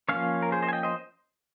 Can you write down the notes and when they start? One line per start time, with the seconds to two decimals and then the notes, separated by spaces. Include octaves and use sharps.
0.09 F3 A#3 C#4 C#5 F5
0.42 A#4
0.52 G#4 C5
0.62 C5 D#5
0.69 G#5
0.73 D#5 G5
0.83 C5 D#5